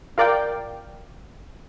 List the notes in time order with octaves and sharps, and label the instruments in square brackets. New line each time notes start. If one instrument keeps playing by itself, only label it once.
[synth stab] F4 A#4 D5 F5 G5